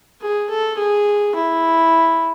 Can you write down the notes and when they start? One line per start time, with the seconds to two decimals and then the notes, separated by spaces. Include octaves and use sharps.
0.22 G#4
0.50 A4
0.78 G#4
1.36 E4